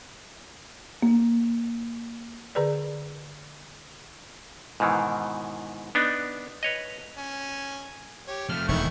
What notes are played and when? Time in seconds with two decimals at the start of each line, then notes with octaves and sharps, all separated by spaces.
1.02 A#3
2.55 D3 G#4 B4 D5
4.80 G#2 B2 D#3 E3
5.95 B3 D4 D#4
6.63 B4 C#5 D#5
7.18 C#4
8.28 G4 C#5
8.49 F2 A3 F6
8.69 E1 D#2 D#3 E4 C#6